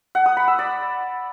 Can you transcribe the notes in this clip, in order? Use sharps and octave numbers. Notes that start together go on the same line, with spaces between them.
F#5
D#6
B5
E6
D5